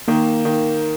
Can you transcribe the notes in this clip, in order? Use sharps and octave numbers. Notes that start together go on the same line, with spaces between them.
D#3 A#3
D#3